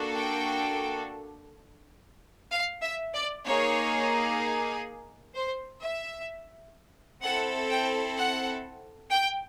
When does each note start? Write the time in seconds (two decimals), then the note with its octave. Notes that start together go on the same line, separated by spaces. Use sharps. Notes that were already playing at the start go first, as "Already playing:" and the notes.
Already playing: A#3 D4 F#4 A4
0.16 G5
2.51 F5
2.83 E5
3.14 D5
3.45 A#3 D#4 G#4 C#5
5.34 C5
5.81 E5
7.22 C4 E4 A4 F#5
7.69 G5
8.17 F#5
9.11 G5